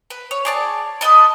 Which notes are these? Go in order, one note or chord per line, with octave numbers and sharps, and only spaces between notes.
B4
C#5
G#4 D5 A5
B4 C5 D#5 A5